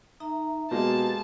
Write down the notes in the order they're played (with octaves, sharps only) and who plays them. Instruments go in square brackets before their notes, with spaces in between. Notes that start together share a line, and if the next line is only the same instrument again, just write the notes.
[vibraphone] D#4 E5 A#5
[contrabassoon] B2 [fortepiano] G#3 A#3 F5 [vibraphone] G4 [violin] A5